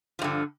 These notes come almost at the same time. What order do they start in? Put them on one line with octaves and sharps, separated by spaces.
F3 G2 D3